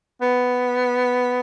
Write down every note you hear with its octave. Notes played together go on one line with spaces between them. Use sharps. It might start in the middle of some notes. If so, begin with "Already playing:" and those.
B3